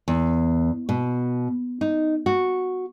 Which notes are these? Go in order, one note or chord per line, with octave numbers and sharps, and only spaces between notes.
E2
B2
D#4
F#4